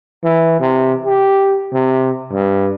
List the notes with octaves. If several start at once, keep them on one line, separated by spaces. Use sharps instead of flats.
E3
C3
G4
C3
G2